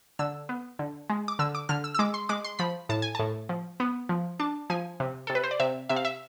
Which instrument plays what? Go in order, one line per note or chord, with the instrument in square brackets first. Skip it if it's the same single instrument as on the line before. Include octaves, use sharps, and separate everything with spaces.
[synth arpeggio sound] D3 E6
B3
D3
G#3
D6
D3 E6
D6
D3 F6
E6
E6
G#3 D6
C6
G#3 D6
C6
F3 B5
A2 A5
G#5
A2 A5
F3
B3
F3
D4 A5
F3 G#5
C3
C3 A4
B4
C5
D5
C3 E5
C3 E5
F5
E5